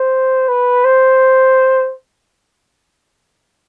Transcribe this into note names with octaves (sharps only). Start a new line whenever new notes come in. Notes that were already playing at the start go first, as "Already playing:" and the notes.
Already playing: C5
B4
C5